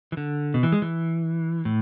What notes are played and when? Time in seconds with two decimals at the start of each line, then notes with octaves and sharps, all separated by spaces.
0.12 E3
0.17 D3
0.54 B2
0.63 E3
0.72 G#3
0.82 E3
1.65 A2